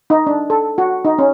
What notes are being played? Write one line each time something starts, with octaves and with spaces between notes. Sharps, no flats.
D#4
D4
A4
F#4
D#4
C#4